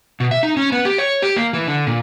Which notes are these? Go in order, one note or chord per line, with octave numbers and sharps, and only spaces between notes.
B2
E5
D#4
C#4
B3
G4
C#5
G4
A#3
E3
D3
A#2